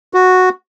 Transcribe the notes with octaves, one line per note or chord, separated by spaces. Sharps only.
F#4